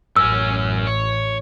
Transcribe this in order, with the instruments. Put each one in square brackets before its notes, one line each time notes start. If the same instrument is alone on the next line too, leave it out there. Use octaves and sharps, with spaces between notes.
[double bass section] A1 [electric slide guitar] F#2 C#4 [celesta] E6
[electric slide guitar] C#5